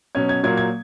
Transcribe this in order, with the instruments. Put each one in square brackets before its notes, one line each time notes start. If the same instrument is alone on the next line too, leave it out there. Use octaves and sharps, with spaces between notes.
[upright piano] B2 F#3 C#4 G#6
G#6
A#2 F#3 A#3 G#6
G#6